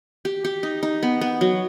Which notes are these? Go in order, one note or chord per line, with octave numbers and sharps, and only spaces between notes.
G4
G4
D#4
D#4
B3
B3
F#3